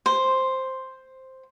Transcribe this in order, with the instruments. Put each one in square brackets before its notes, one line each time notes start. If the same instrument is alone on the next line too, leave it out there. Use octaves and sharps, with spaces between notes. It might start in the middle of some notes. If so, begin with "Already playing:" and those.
[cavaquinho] C5